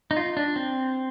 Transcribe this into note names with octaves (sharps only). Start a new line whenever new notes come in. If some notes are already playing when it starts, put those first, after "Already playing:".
D#4
F4
D4
C4